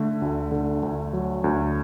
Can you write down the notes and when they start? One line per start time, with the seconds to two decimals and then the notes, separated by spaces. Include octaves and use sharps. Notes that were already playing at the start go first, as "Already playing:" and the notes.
Already playing: D3 A3
0.22 D2
0.52 D3
0.83 D2
1.13 F#3
1.44 D2